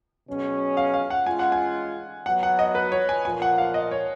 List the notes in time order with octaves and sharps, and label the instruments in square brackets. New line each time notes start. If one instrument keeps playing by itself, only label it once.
[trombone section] B2 F#3 C#4 G#4
[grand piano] F5
F5
F#5
[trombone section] G#3 C#4 F4 [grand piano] G#5
[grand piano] F#5
G#5
[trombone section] F#3 B3 F#4 [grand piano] F#5
[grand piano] F#5
D#5
B4
C#5
G#5
[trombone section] A#2 F3 A#3 F4 [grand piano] G#5
[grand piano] F#5
F5
D#5
C#5